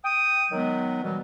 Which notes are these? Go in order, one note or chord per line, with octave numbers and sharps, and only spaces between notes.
G5 D#6
D#3 F#3 G#3 B3
B2 E3 F#3 G3